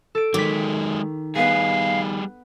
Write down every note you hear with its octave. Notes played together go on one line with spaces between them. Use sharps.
A4 D7
D#3 F#3 G#3 D6 B6
G3 B3 G#4 B4 F5